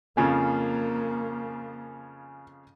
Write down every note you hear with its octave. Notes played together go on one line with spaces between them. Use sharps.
F2 C#3 F3 A#3 G#5